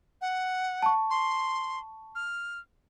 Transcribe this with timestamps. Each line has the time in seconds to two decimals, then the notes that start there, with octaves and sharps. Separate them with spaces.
0.21 F#5
0.82 A5 C#6
1.10 C6
2.15 F6